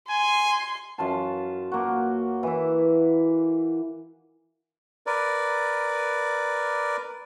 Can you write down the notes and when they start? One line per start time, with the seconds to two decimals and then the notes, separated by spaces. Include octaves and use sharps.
0.10 G#5 C6
0.98 F#2 F4 G#5 A5
1.72 A#3 F#4
2.43 E3 E4
5.07 A#4 B4 D5